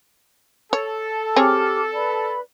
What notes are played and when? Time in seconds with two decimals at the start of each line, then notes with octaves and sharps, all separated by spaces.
0.73 A4 C#5
1.36 C4 G4 G#4 C#5 D6 F6
1.93 B4 D5 B5